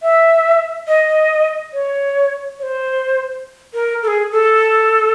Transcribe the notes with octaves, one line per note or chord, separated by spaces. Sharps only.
E5
D#5
C#5
C#5
C5
A#4
A4
G#4
A4